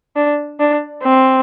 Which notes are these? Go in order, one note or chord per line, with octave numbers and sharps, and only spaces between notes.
D4
D4
C4